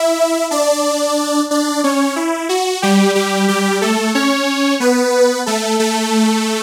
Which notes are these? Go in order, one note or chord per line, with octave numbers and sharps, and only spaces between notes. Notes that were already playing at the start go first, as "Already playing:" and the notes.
Already playing: E4 E5
D4 D5
D4 D5
C#4 C#5
E4
F#4
G3 G4
G3 G4
G3 G4
A3 A4
C#4 C#5
B3 B4
A3 A4
A3 A4